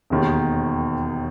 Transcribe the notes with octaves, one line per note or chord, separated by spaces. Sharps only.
E1 D#2 D#3